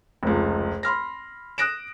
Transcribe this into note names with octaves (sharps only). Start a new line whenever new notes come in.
F1 C#2
B5 C6 F6 A#6
D#6 F#6 A#6 D7 E7